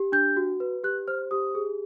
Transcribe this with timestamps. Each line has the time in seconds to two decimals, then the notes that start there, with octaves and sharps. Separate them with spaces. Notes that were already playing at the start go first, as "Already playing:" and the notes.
Already playing: G4
0.12 D4 G6
0.37 F#4
0.60 B4
0.84 G4 F#6
1.08 C5 F6
1.31 G4 D#6
1.55 G#4